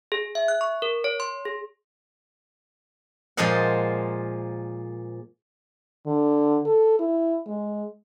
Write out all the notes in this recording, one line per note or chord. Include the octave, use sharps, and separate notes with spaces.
G#4
E5
F#6
C#6
A#4
C#5
C6
G#4
A#2 F3 G#3 C5 D#5 F#5
D3
A4
E4
G#3